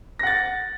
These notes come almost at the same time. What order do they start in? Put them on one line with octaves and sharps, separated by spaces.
A#6 F#5 A6